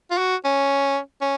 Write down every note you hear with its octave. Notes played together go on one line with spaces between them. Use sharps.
F4
F#4
C#4
C#4